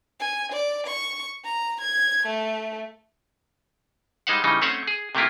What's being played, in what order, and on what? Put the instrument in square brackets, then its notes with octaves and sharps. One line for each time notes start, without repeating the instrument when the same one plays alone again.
[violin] G#5
D5
C#6
A#5
G#6
A3
[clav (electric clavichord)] G3 G#3 D#4 C5 F5 F#5
C#3 E3 G3 D#4
A3 C4 C#4 C5 C#5 F#5
G#4
C3 A3 A#3 E4 F4